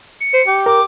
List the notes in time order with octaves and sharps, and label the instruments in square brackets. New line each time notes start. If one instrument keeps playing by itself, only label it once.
[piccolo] C#7
[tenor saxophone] C5
G4
[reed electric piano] A#4 [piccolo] D6